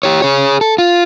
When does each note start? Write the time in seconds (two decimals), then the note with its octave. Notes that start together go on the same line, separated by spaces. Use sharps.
0.03 G4 C#5
0.22 G#4 C#5
0.61 A4
0.78 F4